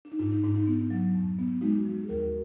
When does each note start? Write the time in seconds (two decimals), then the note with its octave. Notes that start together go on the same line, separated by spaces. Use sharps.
0.05 D4
0.12 D#4
0.19 G#2 D4 F4
0.32 D#4
0.43 G#2 D4
0.56 D#4
0.67 B3
0.90 F#3
1.15 F2
1.39 B3
1.61 G#3 D#4 F#4
1.85 F3
2.04 G#4
2.09 D#2 F#4 A#4